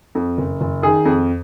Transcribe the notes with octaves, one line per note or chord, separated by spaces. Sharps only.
F2
F#1
F#1
D#3 G#4
F2